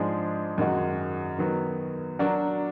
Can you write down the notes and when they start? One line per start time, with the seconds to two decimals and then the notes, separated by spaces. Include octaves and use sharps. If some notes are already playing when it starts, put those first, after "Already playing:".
Already playing: G#2 F3 G#3 D4 G#4
0.58 F#2 D#3 G#3 D#4 F#4
1.38 D#3 F#3 B3
2.19 F#3 D4 F#4 A#4